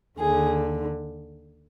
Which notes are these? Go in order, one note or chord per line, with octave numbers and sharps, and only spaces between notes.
D#2 D3 G#4